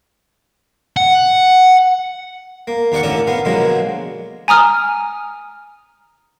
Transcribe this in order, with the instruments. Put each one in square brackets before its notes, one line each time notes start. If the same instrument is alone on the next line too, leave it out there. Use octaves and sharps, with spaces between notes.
[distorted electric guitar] F#5
[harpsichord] A#3
D#2 A#3 A#4 D5 F#5 C#6
A1 D3 C#4 A4 A#4 D5
B3 A#4 F5
B2 D3 F3 F#3 G#3 A#3
[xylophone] G#5 A#5 D#6 F6